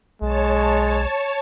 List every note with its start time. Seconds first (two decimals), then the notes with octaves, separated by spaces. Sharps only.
0.22 B1 G#3 C#5 A5